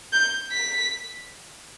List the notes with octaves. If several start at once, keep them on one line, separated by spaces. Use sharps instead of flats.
G6
B6